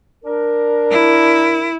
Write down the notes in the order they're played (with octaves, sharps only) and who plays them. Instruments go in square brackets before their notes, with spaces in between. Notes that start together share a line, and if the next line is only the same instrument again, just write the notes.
[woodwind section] D4 A#4
[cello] E4